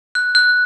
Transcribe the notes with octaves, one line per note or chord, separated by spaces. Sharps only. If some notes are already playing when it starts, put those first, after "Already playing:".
F#6
F#6